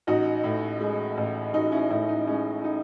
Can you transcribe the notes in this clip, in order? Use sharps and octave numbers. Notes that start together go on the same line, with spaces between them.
A1 D#4 F#4
A2
G#3
A1
A1 D#4 F#4
C#4 E4
A2 C#4 E4
D#4
G#3 C#4
D#4